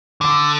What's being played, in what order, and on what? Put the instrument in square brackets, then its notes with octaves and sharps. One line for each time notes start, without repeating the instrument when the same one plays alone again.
[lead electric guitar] D3